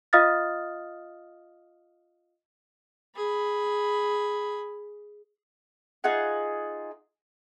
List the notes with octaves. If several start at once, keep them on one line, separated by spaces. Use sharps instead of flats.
F4 D#5 F5 D#6 F6 A6
G#4 B5
D#4 F4 G#4 F#5